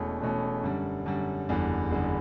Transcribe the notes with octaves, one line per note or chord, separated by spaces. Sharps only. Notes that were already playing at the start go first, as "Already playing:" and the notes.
Already playing: E1 E2 B2 A3 C#4
E1 E2 B2 A3 C#4
F#2 D3 G3
F#2 D3 G3
F#1 E2 D3 G3
F#1 E2 D3 G3